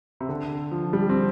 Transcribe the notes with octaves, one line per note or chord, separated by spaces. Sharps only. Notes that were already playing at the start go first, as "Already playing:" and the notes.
C3
D3
F3
G3
C4